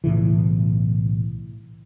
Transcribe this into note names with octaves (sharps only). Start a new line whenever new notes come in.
B1 A2 C#3 E3